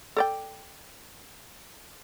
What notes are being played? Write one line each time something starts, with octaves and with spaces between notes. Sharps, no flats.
A4 D5 G5